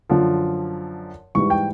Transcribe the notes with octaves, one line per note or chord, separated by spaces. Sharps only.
F#2 D3 F3
G#2 E3 G3 C#6
G5